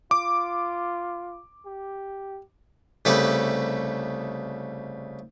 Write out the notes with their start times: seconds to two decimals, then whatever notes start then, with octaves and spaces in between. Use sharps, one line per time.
0.11 F4 D6
1.66 G4
3.05 C2 C#3 A3 G4 A4 B4